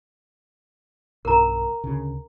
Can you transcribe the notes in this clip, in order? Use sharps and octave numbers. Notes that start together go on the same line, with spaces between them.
B1 G2 A#4 A#5
D2 C#3